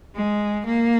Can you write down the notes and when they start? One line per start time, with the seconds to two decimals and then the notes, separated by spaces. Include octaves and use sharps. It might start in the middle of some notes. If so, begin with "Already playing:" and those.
0.15 G#3
0.65 A#3